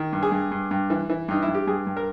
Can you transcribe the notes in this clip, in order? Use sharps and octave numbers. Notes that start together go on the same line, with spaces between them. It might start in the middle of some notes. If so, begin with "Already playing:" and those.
Already playing: D#3
G2
G#4
G2
G2
G2
E3
E3
G2 D#4
E4
G2
G4
G2 G#4
G2
A#4